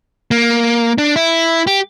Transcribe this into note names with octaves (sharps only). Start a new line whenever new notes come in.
A#3
D4
E4
G4